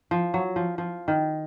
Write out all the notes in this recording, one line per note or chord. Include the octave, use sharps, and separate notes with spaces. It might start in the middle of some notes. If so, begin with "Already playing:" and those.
F3
F#3
F3
F3
D#3